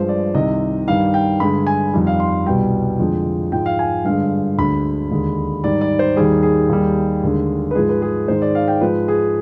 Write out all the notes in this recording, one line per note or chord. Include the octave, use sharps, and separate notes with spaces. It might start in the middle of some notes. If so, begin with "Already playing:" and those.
Already playing: G2 F3 G#3 C5
D5
C2 C3 D#3 D#5
G2 D#3 G3 F5
G5
G2 D3 G#3 B5
G#5
F2 D#3 G3
F5
C6
C2 B2 G3 G5
F2 D3 F3 G#3
G#2 F3 G#3 G5
F5
G#5
G2 D3 G#3 F5
D2 D3 G#3 B5
D#2 D3 G#3
G#2 D#3 G3 D5
D5
C5
D#2 D#3 G3 G#4
G#4
D#2 D#3 G3
D#2 D3 G#3
B4
G#2 F3 G#3 G#4
B4
G#4
G#2 D#3 G#3 C5
D5
F5
G5
G#2 F3 G#3 B4
G#4